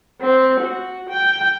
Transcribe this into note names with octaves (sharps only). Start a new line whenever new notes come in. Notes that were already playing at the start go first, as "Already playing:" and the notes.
C4
F#4
G5